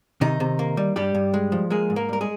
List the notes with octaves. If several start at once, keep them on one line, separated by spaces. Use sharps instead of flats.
C3 D#3 D#4
C3
A#3
G3
G2 G3 G4
G2
G#3
F3
G#3 A#3 G#4
G#2
A#3 A#4
G3 A#4
G#3 G#4